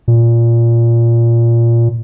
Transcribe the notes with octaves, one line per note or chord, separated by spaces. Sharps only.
A#2